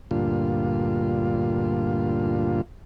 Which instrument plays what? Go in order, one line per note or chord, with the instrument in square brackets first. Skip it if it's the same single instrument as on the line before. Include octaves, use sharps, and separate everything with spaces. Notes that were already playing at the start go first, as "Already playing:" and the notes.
[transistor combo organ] D2 G2 A#2 F4